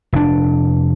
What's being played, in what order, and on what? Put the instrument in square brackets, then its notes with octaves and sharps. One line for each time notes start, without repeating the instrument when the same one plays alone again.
[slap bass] F1 D4